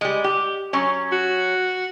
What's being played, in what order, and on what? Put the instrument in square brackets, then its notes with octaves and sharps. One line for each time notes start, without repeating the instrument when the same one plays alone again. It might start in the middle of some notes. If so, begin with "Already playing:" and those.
[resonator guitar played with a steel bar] G3 G#3
G4
F#3 C#4
[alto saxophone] F#4